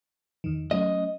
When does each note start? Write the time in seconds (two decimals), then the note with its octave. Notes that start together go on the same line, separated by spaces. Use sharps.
0.44 E2 D#3
0.71 F#3 A3 C#4 D#5